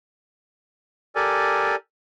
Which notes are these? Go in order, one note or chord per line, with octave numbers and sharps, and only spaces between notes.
G4 A4 A#4 D5 G#5